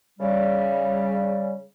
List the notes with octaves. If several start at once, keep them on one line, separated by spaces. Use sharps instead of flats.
C#3 G3